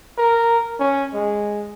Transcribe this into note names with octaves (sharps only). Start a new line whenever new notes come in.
A#4
C#4
G#3